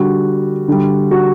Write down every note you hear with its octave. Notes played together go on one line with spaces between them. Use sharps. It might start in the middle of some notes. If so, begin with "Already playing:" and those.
Already playing: D3 G3 F#4
D3 G3
F#4